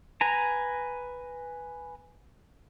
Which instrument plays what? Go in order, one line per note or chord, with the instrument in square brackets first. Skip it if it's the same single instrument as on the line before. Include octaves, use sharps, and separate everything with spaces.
[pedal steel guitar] B4 G#5 A#5